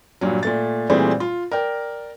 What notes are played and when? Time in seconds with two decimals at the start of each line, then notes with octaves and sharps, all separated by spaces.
0.21 G2 A#2 F#3
0.43 A#2 A3 A6
0.90 A#2 E3 G3 A3 C4 G#4
1.20 F4
1.51 A#4 D5 G5